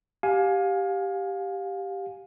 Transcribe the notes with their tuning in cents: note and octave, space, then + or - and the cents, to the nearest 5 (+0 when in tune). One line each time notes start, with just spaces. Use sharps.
G4 +0 F5 +25 G#5 +10